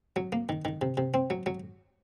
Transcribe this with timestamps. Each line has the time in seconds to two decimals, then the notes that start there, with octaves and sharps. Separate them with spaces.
0.16 F#3
0.32 A#3
0.49 D#3
0.65 D#3
0.82 C3
0.97 C3
1.14 C4
1.30 F#3
1.46 F#3